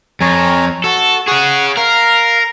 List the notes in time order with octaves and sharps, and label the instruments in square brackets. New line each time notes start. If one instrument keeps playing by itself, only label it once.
[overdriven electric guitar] F2 [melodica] C#5 G#5 A#5
[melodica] F#4 [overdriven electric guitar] A4
[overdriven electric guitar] G#4 C#5 [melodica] F#5 C#6
[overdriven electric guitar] A#4 [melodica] F5